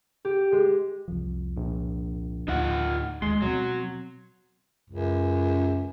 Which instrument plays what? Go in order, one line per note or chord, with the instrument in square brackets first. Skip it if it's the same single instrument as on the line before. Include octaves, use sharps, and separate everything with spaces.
[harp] G4
G#3
[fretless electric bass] C2 F2 F3
[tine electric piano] A#1
[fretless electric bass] D2 A2 [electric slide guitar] D#4 F4 F#5
[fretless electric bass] D#2 [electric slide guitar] G#3 [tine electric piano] C6
[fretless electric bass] B2 G#3 C4 [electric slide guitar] F#3
[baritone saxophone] C#2 [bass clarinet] F#2